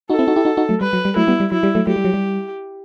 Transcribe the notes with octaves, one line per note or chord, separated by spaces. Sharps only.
D#4 F#4 A4
C4 E4
D#4 F#4
E4 G4
D#4 F#4
D#4 F#4
F#3 A3
G3 B4
F#3
G3
F#3 A3 E4
G3 B3
G3
F#3 E4
G3
F#3 A3
F#3 A3 G4
G3
F#3
G3